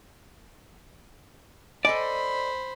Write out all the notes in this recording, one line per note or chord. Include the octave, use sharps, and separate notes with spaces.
A4 C5 D5 D#5 G#5 B5